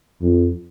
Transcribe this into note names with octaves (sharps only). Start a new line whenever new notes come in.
F2